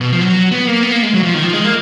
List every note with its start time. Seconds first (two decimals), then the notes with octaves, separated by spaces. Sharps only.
0.01 B2
0.12 F3
0.21 F#3
0.52 B3
0.67 A#3
0.83 B3
0.92 A#3
1.03 G#3
1.14 F#3
1.23 F3
1.34 D#3
1.43 F3
1.53 G#3
1.64 A#3